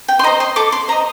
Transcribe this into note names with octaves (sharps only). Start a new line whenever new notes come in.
G5
C6
C5 D#5 A#5
C6
A4 D6
C6
C5 D#5 A#5